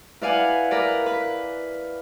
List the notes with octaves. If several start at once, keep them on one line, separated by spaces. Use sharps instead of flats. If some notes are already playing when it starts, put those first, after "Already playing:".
E4 B4 D5 F5 F#5 G#5
A#4 B4 D5
B4